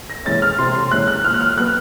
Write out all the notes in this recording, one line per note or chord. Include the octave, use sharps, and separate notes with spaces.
A#6
E3 G#3 C#4 A6
F6
C3 C6
C6
E3 G#3 C#4 F#6
F#6
A#2 F6
F#6
F6
F#3 B3 F#6